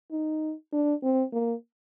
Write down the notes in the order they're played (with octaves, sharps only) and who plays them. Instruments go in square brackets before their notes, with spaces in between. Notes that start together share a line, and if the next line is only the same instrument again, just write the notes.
[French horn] D#4
D4
C4
A#3